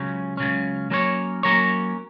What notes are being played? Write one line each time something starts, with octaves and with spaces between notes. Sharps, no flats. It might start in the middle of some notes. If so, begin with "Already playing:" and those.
Already playing: C#2 C#3 F#3 C#4
C#2 C#3 F#3 C#4
F#3 A#3 C#4 A#4 C#5
F#3 A#3 C#4 A#4 C#5